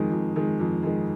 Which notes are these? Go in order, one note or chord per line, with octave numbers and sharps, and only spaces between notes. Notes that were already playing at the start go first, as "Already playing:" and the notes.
Already playing: F2 D#3 G#3
F2
D#3 G#3
F2
D#3 G#3